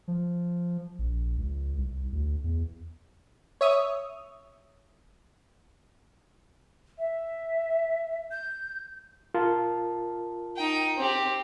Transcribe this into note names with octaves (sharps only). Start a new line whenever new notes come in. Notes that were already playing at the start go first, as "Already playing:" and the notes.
F3
A#1
C#2
C2
D2
E2
C#5 E5 D#6
E5
G6
F4 A#4 A5
D#4 G5
C4 G4